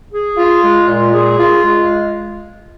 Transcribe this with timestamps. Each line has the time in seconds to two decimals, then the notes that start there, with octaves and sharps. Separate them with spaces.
0.11 G#4
0.37 F4
0.62 G#3
0.87 A#2
1.13 G#4
1.38 F4
1.63 G#3